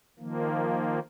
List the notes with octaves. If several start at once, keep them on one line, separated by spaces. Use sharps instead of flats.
D#3 F3 A#3